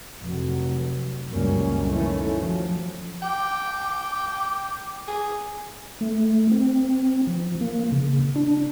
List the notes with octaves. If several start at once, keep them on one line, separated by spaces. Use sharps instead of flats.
F1 F#3
C#2 F#2 A#2 G3 A#3 C#4
D#3 E3 A3 C#4
F3 F#3
G5 D6
G#4
A3
C4
F3
A#3
C#3
D4